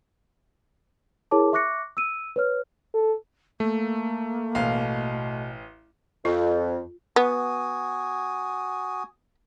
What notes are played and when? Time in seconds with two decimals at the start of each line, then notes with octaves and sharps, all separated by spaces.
1.31 E4 G#4 A#4 C#5 A5 D6
1.53 E5 C#6 D6 F#6 A#6 C#7
1.97 E6 D#7
2.36 B4 C#5 F6
2.94 A4
3.60 A3 A#3
4.55 A1 B2 F5
6.25 F2 F4
7.16 B3 F#4 G#5 D#6